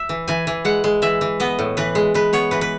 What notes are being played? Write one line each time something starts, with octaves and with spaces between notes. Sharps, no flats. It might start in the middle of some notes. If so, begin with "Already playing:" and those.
Already playing: E5
E3
E3 G#5
E3
G#3 F#5
G#3
E3 E5
E3
B3 D#5
A2
E3 B4
G#3
G#3 B4
B3 C#5
E3 B4
B4